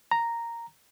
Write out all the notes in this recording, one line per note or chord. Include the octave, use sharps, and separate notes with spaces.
A#5